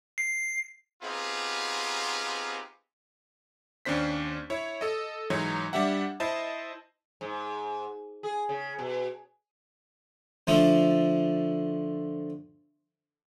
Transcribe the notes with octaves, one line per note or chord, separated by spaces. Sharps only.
C7
B3 C4 D#4 F4 G4 G#4
D#2 C#4 D4 C5 B6
E4 C#5
A4 D#5
G#2 E3 F#3 D#4 C#5 G#6
G3 D4 G4 E5 F#5
E4 C5 D#5 A5
G#2
G#4
C#3
B2
D3 F3 A3 F4